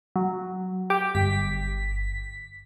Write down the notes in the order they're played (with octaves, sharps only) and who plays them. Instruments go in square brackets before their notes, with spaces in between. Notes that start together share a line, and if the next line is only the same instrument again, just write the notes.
[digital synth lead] F#3
[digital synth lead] G4 [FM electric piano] G5 D6
[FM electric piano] G1 [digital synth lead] B6